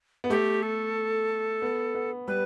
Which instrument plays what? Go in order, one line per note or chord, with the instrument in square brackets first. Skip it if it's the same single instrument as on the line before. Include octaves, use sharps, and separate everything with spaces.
[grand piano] B3
[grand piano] A3 [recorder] G4
[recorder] A4
[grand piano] B3
B3
[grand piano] G3 [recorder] B4